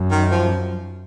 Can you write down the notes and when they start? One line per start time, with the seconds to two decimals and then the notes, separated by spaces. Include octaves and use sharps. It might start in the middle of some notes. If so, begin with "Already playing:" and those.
Already playing: F#2
0.11 D#3
0.31 F3